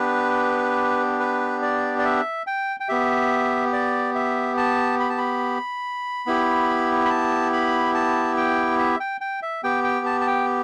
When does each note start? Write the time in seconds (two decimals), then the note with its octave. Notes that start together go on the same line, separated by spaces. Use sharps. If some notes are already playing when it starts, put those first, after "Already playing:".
Already playing: B3 D4 G4 B4
1.20 B4
1.62 D5
1.99 D5
2.05 E5
2.47 G5
2.80 G5
2.88 B3 G4 E5
3.73 D5
4.15 E5
4.57 A5
5.00 B5
5.09 A5
5.18 B5
6.26 B3 E4 G4
7.05 B5
7.10 A5
7.53 B5
7.94 A5
8.37 G5
8.79 E5
9.00 G5
9.21 G5
9.42 E5
9.63 B3 G4 G5
9.84 G5
10.06 A5
10.21 A5
10.27 G5